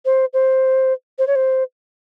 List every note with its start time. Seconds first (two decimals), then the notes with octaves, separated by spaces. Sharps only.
0.05 C5
0.33 C5
1.19 C5
1.27 C#5
1.35 C5